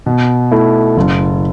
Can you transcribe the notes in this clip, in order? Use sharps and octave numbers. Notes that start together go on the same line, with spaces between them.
B2
A3 E4
F#1